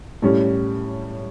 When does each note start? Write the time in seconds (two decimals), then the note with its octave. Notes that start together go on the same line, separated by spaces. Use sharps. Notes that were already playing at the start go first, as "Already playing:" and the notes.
0.22 A2 G3 C#4